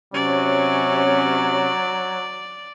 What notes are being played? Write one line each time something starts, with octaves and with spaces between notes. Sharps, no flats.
C3 F#3 C#4 D5